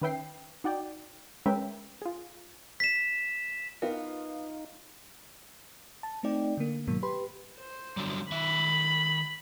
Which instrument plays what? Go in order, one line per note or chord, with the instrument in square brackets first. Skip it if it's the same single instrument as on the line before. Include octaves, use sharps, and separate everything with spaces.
[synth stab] D#3 C#4 B4 E5 G5 C7
D#4 F#4 D5 G5
G#3 C#4 A#4 B4 E5 G5
F4 G#4
[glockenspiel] B6 E7
[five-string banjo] B3 [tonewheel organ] D#4 [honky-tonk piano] F4 [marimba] A#4 F5
[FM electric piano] A5
A3 C4 D#4 D5 G5
D3 A#3
G#2 B2 D#3 F#3 A#3
G4 B4 B5 C6
[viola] C5
[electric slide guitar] D3 F#3 G3
[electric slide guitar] D#3 E5 [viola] B5